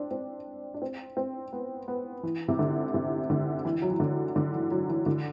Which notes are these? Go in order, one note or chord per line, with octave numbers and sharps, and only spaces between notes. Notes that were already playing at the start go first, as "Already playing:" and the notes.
Already playing: C4 D4
C4
D4
C4
C4
B3
B3
E3
C3
D3
C3
D3
E3
F#3
E3
D3
D3
E3
F#3
E3
D3